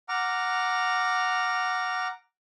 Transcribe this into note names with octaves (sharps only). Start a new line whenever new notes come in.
F#5 A#5 D6 F6